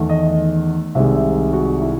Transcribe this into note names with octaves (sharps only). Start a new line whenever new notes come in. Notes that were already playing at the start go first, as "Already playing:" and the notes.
Already playing: E2 D#3 A3
D#5
C2 C3 D#3 G#3 E5
F#4
E4